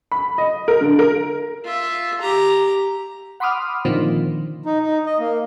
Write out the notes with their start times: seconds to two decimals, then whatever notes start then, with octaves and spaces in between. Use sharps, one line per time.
0.12 B5
0.38 D#5
0.68 A#4
0.81 D3
0.99 A#4
1.64 F4 E5
2.21 G4 A#5
3.40 F#5 B5 C6 D6 D#6 F6
3.85 A#2 D3 D#3 F3 C4
4.66 D#4
4.82 D#4
5.06 D#5
5.19 A#3